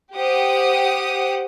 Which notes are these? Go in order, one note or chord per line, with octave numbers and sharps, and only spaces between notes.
G4 C5 F#5 D#6